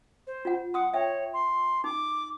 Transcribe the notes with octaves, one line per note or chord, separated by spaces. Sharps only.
C5
F4 F#5
F#5 C6 D#6
C#5 E5 G5
C6
D#4 D6